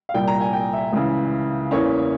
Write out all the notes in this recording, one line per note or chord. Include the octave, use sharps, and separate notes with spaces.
F5
C2 A#2 G3 G5
A#5
G#5
G5
E5
C#2 C#3 E3
E2 E3 A#3 C#4 C#5